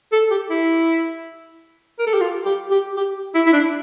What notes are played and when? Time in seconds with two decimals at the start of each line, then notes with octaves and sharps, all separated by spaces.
0.12 A4
0.31 G4
0.50 E4
1.99 A#4
2.06 A4
2.13 G4
2.21 F4
2.45 G4
2.71 G4
2.97 G4
3.35 E4
3.46 E4
3.53 D4